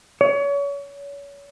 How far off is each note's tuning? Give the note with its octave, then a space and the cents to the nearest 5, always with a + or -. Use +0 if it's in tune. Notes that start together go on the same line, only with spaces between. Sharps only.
C#5 +35